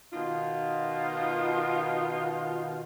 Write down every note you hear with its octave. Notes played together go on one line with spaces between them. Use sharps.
B2 D#3 D#4 F4